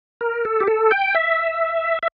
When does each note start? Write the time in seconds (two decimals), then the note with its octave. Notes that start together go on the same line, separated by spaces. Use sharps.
0.21 A#4
0.45 A4
0.60 G4
0.67 A4
0.91 G5
1.15 E5
2.03 E5